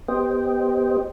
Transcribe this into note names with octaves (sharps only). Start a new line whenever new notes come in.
B3 G4 C5 D#5 G5